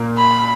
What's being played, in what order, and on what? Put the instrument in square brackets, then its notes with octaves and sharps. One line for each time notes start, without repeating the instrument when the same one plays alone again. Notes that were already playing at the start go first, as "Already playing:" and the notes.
Already playing: [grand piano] A#2 A#3
[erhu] B5